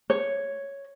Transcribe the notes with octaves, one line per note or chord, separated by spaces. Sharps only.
C#5